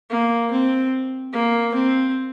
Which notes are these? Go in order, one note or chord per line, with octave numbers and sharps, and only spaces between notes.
A#3
C4
A#3
C4